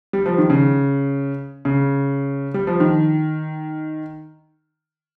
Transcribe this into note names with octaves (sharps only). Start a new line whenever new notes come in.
G3
F3
D#3
C#3
C#3
G3
F3
D#3